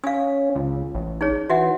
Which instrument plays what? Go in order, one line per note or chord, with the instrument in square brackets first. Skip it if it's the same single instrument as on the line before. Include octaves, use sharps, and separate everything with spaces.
[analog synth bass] C#4 [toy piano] F5 D#6
[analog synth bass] C#2
A1
[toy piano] D#4 G#4 C#5
[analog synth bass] E3 [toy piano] F#4 E5 F#5